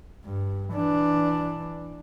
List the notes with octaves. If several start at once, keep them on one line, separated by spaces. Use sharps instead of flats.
G2
E3 D4